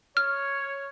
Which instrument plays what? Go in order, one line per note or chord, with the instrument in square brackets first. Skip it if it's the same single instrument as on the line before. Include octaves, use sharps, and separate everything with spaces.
[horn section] C#5 [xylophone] F6